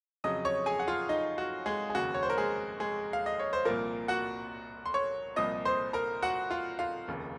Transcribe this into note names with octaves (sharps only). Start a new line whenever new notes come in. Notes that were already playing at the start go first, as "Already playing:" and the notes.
F2 C#3 F#3 D#5 D#6
C#5 C#6
G#4 G#5
F#5
F4 F5
D#4 D#5
F#4
G#3 G#4
G#4
F1 D#2 C#3 F#4
C#5
C5
A#4
G#3 G#4
G#3 G#4
F5
D#5
C#5
C5
C2 A#2 F3 A#3 A#4
F#4 F#5
C6
C#5 C#6
C2 A#2 F3 D#5 D#6
C5 C6
A#4 A#5
F#4 F#5
F4 F5
F4 F5
F1 D#2 C#3